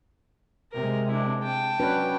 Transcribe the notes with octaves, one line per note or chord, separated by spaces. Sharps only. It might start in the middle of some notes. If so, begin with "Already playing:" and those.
C3 G#3 A#4
D4 E4
G5 A5
F#3 C#4 D4 F#4 B4